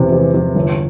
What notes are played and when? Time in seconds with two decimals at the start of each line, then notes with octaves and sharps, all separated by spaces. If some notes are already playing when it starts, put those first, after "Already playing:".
Already playing: E2 C3
0.13 E2
0.34 E2
0.55 G1